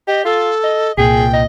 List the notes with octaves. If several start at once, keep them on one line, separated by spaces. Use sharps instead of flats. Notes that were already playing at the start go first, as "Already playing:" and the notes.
G4 D#5
F4 A4
D#5
C2 A#2 G#4 G5
D#5